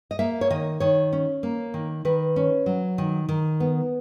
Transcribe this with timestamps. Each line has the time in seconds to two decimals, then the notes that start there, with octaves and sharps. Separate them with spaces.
0.11 D#5
0.19 A#3 E5
0.41 C#5
0.50 D#3 D#5
0.80 D#3 C#5
1.13 C#4
1.43 A#3
1.74 D#3
2.05 D#3 B4
2.36 C#4
2.66 F#3
2.98 D#3
3.29 D#3
3.60 B3